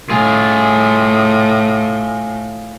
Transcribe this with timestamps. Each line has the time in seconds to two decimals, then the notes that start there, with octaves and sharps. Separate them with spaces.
0.10 A2 F4 G#4